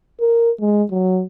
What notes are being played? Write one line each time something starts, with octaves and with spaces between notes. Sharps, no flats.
A#4
G#3
F#3